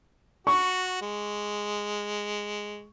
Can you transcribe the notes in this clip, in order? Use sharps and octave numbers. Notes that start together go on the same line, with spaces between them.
F#4 C#6
G#3